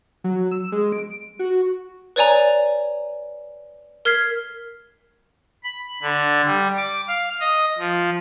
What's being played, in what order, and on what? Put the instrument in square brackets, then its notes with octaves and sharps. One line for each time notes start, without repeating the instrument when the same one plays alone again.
[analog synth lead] F#3
E6
G#3
D7
F#4
[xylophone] B4 C#5 D5 G#5 A#5
A#4 F6 G#6 B6 C7
[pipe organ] B5
D3
G3
D6
F5
D#5
F3